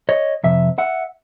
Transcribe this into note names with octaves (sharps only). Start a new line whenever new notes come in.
C#5 D#5
F2 C3 E5
E5 F#5